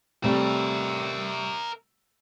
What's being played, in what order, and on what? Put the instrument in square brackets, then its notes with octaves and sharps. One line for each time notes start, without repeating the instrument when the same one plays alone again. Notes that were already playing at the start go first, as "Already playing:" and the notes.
[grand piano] C3 G3 A3 [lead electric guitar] A#4 E5